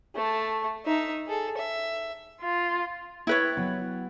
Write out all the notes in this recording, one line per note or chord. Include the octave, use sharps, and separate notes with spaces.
A3 A5
D#4 E5
G#4 A4
E5
F4
E4 B4 C#5 G5 F#6 A6
F#3 B3